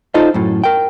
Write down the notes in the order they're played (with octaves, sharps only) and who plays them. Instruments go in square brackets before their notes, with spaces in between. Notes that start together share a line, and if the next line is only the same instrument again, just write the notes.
[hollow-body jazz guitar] D#4 F4 A4 C5 D#5
F#2 A2
A#4 G5